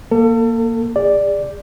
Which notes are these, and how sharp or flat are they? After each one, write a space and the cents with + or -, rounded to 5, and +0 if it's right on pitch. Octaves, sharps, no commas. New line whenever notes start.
A#3 +0 A4 +35
G#4 -35 D5 +0